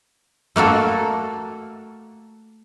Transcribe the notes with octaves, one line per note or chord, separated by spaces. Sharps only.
A3 A#3 F#4 A4